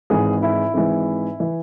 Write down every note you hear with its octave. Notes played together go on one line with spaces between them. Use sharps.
G#1 G#2 E3 G#4
E4
G#1 G#2 E3
E3